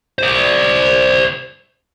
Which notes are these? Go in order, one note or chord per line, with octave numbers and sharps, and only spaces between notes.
C5 D5